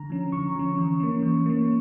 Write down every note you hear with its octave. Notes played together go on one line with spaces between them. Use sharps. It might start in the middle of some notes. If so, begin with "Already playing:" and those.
Already playing: D3 A#5
F3 C#4
D3 C#6
F3 C#4
E3
A#3 C#4
E3
A#3 C#4